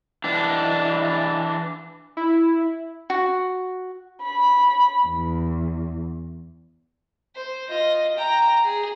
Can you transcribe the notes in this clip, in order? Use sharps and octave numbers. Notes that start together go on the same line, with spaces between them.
E3 D4
E4
F#4
B5
E2
C5
F4 D#5
G5 A#5
G#4